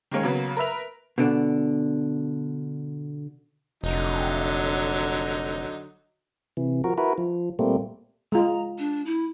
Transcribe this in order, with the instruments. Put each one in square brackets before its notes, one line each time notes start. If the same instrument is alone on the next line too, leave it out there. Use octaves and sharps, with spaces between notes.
[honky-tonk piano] D#3 G#3 A#3 C#4
C#3 F#3 A#3 B3
A#4 B4 E5 F7
[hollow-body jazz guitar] B2 D3 D4
[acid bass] F1 [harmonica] D3 F#3 D#4
[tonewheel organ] C3 E3
F3 F#4 A#4
E4 F#4 A#4 B4
F3
A#2 G3 A3 A#3 C4
[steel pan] G#3 F4 [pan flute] A#5
[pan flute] D4
E4